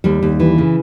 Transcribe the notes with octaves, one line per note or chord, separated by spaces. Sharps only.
D#2 G3
D#2
E3
C#3